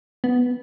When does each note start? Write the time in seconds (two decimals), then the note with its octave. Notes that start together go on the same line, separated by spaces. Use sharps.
0.24 B3